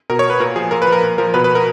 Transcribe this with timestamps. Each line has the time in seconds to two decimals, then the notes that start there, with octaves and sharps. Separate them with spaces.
0.10 B2 A#4
0.19 C#5
0.30 B4
0.40 A#2 A#4
0.56 F3 G#4
0.71 A#2 A#4
0.82 B4
0.87 F3
0.92 A#4
1.03 A#2
1.18 F3 A#4
1.34 B2 B4
1.44 B4
1.55 A#4